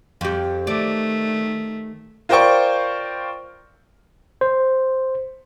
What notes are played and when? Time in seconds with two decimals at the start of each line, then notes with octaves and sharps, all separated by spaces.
0.21 F2 G4
0.67 D#3 A3 D5
2.29 F4 A#4 C5 D5 G5 C#6
4.41 C5